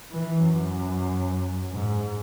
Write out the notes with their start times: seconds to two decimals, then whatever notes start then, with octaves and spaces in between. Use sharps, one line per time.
0.10 E3
0.43 F#2
1.72 G#2